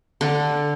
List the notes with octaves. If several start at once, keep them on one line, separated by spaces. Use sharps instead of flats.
D3